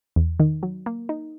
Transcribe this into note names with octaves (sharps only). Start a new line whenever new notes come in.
E2
D#3
F#3
A#3
D#4